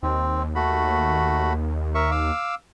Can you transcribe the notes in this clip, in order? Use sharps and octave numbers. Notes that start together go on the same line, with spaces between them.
D#2 C4
A3 F#4 B5
A#4 E5 C#6
F5 D6 E6